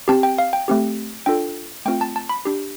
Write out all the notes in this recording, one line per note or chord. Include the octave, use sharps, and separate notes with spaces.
C4 G4 A5
G5
F5
G5
A3 C4 G4
D4 F4 A4 G5
A3 C4 F4 G5
A5
A5
B5
D4 G4